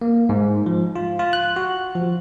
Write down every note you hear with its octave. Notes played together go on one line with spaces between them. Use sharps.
A#3
G#2
F3
F4
F4
F#6
F#4
F3